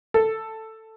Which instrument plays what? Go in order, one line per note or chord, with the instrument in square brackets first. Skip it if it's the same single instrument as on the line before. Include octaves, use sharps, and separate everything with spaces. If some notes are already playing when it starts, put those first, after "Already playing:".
[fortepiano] A4